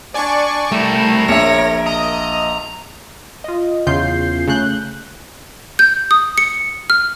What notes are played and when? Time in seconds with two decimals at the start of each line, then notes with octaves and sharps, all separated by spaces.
0.14 D4 D5 G#5 C#6
0.72 G3 A3 E4 A#4
1.28 A#1 C#5 E5 A#6
1.87 D#5 A#5
3.44 F4 D#5
3.87 E2 C#3 F4 G6 C7
4.48 C#3 A3 F#6 G6
5.79 G6
6.11 D#6
6.38 C#7
6.90 F6